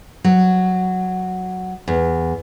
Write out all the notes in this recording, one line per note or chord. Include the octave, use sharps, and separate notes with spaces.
F#3
E2